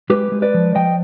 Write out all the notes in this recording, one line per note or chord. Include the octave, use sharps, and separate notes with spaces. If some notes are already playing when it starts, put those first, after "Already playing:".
G#3 G4 B4
G#3
B4 D5
F3
F3 D#5 G5